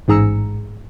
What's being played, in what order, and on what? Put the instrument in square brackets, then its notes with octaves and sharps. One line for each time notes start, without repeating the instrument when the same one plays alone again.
[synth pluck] A1 G#2 G#4 A#5 E6 C#7